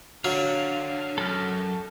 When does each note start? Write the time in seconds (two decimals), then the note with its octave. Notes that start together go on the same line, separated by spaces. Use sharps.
0.25 D3 F#3 F5
1.18 F#2 A4 F6